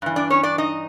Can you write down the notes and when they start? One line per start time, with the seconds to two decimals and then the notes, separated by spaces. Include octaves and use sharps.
0.02 G2 E3
0.16 D4 D5
0.30 C#4 C#5
0.43 D4 D5
0.58 D#4 D#5